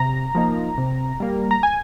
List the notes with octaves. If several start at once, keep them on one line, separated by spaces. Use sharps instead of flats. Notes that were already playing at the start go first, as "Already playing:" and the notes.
Already playing: C3 A#5
F3 A#3 D#4
C3
G3 A#3
A#5
G#5